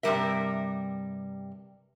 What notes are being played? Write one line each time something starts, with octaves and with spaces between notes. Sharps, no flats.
G2 C3 D#3 G3 A#4 E5